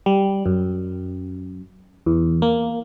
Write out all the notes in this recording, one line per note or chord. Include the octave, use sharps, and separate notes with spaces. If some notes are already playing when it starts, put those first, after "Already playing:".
G3
F#2
E2
A#3